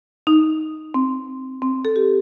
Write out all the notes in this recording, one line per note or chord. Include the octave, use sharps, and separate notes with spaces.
D#4
C4
C4
A4
G4